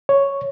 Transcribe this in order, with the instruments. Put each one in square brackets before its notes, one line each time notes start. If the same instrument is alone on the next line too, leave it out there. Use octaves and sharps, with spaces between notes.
[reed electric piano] C#5